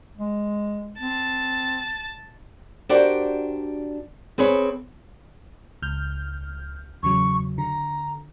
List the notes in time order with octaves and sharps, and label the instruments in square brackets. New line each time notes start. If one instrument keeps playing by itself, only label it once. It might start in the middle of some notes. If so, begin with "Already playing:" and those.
[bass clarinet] G#3
[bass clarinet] C4 [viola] A5
[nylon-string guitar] D4 F#4 G4 A#4 C5 D5
C4 G#4 B4 C#5
[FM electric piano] C#2 F6 G6
[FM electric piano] E2 C#3 F#3 [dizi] C#6
[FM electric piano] D3 [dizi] A#5